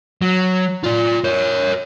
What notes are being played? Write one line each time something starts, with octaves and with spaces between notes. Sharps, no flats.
F#3
F4 D5
A#4 C#5